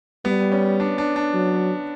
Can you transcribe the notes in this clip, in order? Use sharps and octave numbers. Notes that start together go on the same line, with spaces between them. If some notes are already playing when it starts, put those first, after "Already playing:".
G3 B3
C#4
D4
D4
D4
F#3